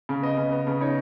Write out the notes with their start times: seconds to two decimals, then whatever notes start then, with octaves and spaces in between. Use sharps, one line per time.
0.09 C#3
0.22 B3 D#5
0.37 C#3
0.52 B3
0.67 C#3
0.80 D#4 C#5